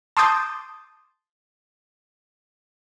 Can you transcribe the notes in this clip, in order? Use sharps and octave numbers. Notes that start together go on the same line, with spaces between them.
A5 C6 D6 D#6 G6 A6